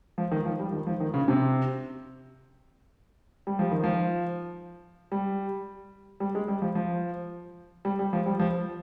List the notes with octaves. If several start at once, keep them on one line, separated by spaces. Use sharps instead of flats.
F3
D#3
F3
G3
D#3
F3
D#3
C#3
C3
G3
F3
D#3
F3
G3
G3
G#3
G3
F3
F3
G3
G3
F3
G3
F3